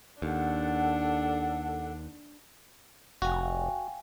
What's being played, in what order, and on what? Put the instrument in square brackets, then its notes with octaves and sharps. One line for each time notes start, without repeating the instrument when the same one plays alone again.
[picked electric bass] D#2 [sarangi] D4 [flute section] A4 F#5
[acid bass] F1 [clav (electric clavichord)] F#4 [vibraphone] F5 G5 G#5